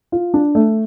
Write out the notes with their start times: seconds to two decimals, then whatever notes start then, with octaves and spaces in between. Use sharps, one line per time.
0.12 F4
0.34 D4
0.55 A3